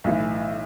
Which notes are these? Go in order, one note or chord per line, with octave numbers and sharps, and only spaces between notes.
B1 A2 E3